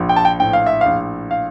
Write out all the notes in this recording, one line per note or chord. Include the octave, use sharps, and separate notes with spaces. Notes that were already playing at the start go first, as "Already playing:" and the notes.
Already playing: A#1 F3
G5
A5
G5
A2 G5
F5
E5
A#1 F5
F5